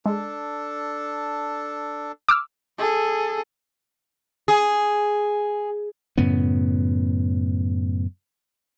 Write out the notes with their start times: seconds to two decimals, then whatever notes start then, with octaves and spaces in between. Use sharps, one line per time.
0.06 G#3 D4 A4
2.29 D6 E6 F6
2.78 G#4 A4
4.48 G#4
6.18 F#2 A2 C#3 B3